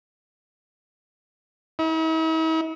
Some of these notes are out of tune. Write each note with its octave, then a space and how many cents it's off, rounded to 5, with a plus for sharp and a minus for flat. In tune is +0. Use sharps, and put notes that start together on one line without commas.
E4 -45